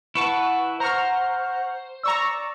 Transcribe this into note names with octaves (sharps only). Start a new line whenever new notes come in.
E4 B4 F#5 A5 C#6
C5 F#5 A#5 C#6 F6
D5 A#5 C#6 E6